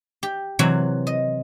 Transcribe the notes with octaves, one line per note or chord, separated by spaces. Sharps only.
G4
C3 E3 F#3 F#4
D#5